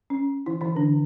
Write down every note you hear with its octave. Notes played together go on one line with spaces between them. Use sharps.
C#4
E3 E4
E3 E4
D3 D4